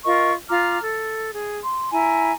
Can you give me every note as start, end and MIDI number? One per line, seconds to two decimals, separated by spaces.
0.05 0.32 65
0.05 0.32 70
0.05 0.32 75
0.05 0.32 85
0.50 0.79 65
0.50 0.79 82
0.50 0.79 86
0.50 0.79 89
0.82 1.30 69
1.33 1.58 68
1.64 1.92 84
1.93 2.32 64
1.93 2.32 80
1.93 2.32 82